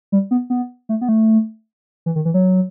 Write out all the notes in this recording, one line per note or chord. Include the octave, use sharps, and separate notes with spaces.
G3
B3
B3
A3
B3
A3
E3
D#3
E3
F#3